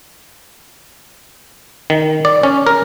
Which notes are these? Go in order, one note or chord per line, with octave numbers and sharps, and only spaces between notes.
D#3
D5
C#4
A#4